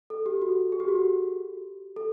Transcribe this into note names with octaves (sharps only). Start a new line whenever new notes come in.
A4
G4
F#4
G#4
G4
F#4
G4
A4